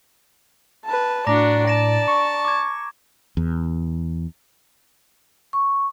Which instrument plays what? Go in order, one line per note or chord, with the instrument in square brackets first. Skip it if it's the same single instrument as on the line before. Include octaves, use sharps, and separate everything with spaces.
[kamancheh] B4 A5
[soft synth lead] A2 [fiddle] D4 F#4 [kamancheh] D5 [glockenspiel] A#5 D6 A#6
[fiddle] A5 [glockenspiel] A#6 D7 E7
[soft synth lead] C#6
[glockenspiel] D6 G#6
[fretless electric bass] E2
[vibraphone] C#6